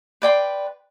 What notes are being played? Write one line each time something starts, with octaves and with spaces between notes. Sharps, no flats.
B4 D5 G5 C6